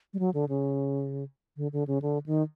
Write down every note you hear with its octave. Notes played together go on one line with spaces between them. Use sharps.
G3
F#3
D3
C#3
D3
D3
C#3
D3
D#3